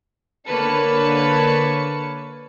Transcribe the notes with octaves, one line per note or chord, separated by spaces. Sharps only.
D3 A#3 B4 C#5 A5 C#7